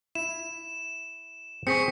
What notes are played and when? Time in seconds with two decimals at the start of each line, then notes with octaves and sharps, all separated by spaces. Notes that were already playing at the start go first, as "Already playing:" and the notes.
0.15 E4 E7
1.67 C4 G#4 C#6 B6 C#7